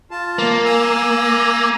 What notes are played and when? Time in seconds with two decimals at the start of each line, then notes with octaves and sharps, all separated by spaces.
0.11 F4 A5
0.39 A#3
0.65 G#5 E6